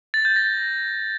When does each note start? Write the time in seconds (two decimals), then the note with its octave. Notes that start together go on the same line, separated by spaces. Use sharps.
0.14 A6
0.25 G6
0.36 A#6